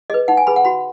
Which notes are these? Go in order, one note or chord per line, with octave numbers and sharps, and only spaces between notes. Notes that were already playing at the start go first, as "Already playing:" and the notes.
G#4 B4 D#5
D#4 F#5
G#5
G#4 B4 B5
F#5
F#4 B5